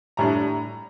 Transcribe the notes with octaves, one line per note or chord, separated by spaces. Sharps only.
A2 G3 D4 A#5